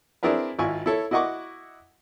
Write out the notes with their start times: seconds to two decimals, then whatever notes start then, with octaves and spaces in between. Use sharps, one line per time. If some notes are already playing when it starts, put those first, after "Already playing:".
0.23 C4 D4 E4 G#4 A#4 B4
0.58 G#1 E4 F4 G#5 C#6
0.86 E4 A4 C#5
1.11 E4 F#4 D#5 F#5 C#6 D6